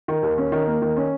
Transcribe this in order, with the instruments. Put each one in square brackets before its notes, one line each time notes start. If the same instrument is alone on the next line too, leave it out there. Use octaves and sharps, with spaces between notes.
[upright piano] D#3
D#2
C#4
D#3
A#3
D#3
C#4